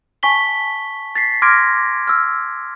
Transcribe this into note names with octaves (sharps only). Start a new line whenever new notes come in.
G#5 A5 C#6 B6 G7
A6 B6 C7
C6 D6 F6 G#6 A#6 D7
E6 F6